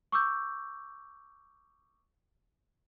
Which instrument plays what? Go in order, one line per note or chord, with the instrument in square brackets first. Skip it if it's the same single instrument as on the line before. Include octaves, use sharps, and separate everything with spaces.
[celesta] C#6 D6 E6 G6